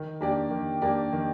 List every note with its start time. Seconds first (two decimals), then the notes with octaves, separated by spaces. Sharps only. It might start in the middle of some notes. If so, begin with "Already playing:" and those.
Already playing: D#3
0.21 A#3 D4 G4 D5
0.51 D#3
0.82 A#3 D4 G4 D5
1.13 D#3